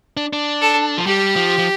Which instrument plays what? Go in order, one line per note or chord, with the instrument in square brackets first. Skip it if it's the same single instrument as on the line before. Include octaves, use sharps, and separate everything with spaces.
[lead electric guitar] D4
D4
[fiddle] A4
[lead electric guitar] F3
[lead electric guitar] G3 [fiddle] G4
[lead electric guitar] F3
F3